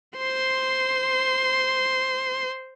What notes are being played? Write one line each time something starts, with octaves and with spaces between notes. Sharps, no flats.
C5 C6